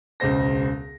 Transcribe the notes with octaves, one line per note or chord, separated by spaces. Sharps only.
E1 C#2 C#3 C5 A#6